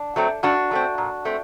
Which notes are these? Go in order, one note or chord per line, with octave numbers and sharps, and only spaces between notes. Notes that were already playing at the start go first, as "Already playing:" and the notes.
Already playing: D4
F#3 A3 C4
G2 D4 F#4
F#3 A3 C4
A#2
A3 C4